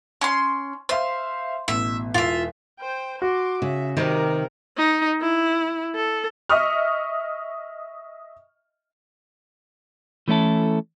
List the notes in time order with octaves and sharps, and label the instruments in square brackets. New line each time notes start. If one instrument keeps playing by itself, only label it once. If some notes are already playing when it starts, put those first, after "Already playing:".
[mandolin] C#4 C6
[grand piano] C5 E5 F5 [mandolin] C6
[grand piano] A1 B2 [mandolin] E5
[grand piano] E1 [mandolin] F4 E5
[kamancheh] C5 G5
[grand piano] F#4 [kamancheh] C6 D6
[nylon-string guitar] C#3 [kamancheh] E5
[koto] C3 G3 [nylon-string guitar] D#3 [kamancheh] A#4
[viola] D#4
E4
A4
[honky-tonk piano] D#5 E5 C#6 D#6 F6
[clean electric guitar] E3 A3 C#4 E4 A4